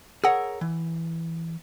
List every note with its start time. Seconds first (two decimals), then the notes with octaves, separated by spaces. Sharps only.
0.24 G#4 A#4 C#5 F#5 E6
0.61 E3